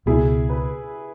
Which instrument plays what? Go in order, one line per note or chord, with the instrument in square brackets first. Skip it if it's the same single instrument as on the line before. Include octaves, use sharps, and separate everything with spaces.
[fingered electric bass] C#2 B2 B3 [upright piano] E4 G#4
[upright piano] B4